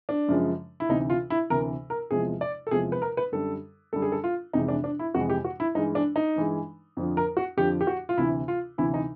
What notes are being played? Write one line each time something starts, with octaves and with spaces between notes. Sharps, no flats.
D4
F#2 C#3 F3 G#3
E4
D2 C3 E3 D#4
F4
E4
D2 C3 E3 A#4
A#4
E2 C3 F3 G#3 G#4
D5
A4
E2 C3 F3 G#3 G#4
B4
A#4
B4
F#2 D3 G3 A4
F#2 D3 G3 A4
G#4
A4
F4
F2 C3 E3 G#3 D#4
D4
D4
E4
F2 C3 E3 G#3 F#4
G4
F#4
E4
G2 E3 G#3 D#4
D4
D#4
G2 E3 G#3
F2 D3 F3
A#4
F#4
F2 D3 F3 G4
G4
F#4
F4
D2 C3 E3 E4
F4
D2 C3 E3 E4
D#4